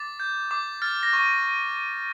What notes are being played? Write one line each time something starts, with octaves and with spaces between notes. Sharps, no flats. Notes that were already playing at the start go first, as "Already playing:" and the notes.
Already playing: D6 A6
G6
D6
F6 A6
A#6
C#6